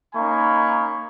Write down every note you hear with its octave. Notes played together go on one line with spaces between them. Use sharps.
A#3 C#4 D#4 G#5 B5 C#6